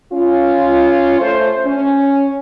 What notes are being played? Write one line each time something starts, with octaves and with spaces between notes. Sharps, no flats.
C#4 F4
A3 C5
C#4